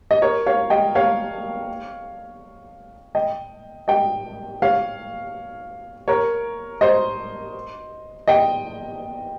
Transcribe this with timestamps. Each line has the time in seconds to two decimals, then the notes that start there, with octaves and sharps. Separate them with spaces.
0.11 D#5
0.22 A#4 C#5
0.46 C#5 F5
0.70 D#5 G5
0.95 C#5 F5
3.15 D#5 G5
3.88 D#5 G5
4.62 C#5 F5
6.08 A#4 C#5
6.81 C5 D#5
8.27 D#5 G5